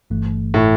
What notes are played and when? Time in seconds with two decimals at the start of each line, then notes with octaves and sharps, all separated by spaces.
0.10 G1 G2 E3 A3
0.54 A2